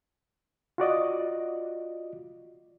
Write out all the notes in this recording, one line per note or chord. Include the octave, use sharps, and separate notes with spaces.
F4 F#4 D5 D#5